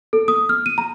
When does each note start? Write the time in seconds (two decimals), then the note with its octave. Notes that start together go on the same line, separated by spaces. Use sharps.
0.13 A4
0.28 D#6
0.49 F6
0.66 D#7
0.78 A#5